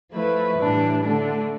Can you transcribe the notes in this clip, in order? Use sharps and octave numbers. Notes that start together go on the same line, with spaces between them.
F3 A3 E4 B4
A2 E3 G3 D4
D3 A3 D4